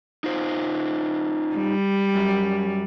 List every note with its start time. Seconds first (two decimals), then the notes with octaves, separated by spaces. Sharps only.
0.24 D#4 F4 C5
1.57 G3
2.15 F#2